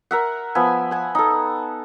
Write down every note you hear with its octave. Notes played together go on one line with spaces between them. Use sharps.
A#4 E5 F#5
F3 B3 E5 G#5
F#5 G#5
D#4 A4